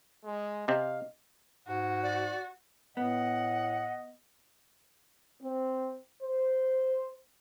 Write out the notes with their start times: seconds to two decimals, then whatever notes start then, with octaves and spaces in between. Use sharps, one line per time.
0.25 G#3
0.68 C3 C4 D#5 F5
1.68 G#2 F#4
2.03 D5
2.97 A2 B3 D#5 F#5
5.41 C4
6.23 C5